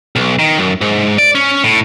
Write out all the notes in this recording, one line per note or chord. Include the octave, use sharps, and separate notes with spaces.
B1
D#3
F#2
G#2
D5
C#4
A2